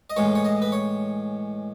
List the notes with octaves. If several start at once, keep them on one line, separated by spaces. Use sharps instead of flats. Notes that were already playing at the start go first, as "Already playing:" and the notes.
D#5
A2 E3 G#3 C#5
C#5
D#5
B4
C#5